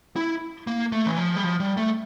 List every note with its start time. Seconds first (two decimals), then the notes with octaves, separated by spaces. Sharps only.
0.16 E4
0.67 A#3
0.92 A3
1.06 E3
1.18 F3
1.36 G3
1.44 F3
1.60 G3
1.77 A3